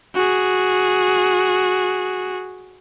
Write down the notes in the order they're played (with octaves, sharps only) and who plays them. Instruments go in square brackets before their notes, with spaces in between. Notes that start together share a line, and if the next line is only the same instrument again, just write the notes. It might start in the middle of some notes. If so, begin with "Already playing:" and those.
[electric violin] F#4 G#4